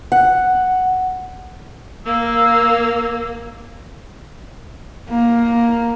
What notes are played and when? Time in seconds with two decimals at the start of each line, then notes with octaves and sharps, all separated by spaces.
0.12 F#5
2.05 A#3 F5 E6
5.09 A#3